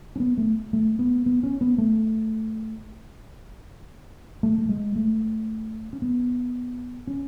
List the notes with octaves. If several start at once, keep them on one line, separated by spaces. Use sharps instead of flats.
C#4
B3
A3
A3
B3
B3
C#4
B3
A3
A3
A3
G#3
A3
C#4
B3
C#4